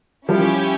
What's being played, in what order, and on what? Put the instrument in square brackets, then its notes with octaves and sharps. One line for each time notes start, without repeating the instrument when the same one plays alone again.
[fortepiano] F3 G3 [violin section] C#4 E4 G4